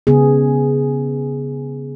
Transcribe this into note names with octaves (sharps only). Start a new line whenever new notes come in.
C#3 B3 G#4